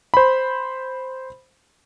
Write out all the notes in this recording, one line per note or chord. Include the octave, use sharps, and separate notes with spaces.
C5 B5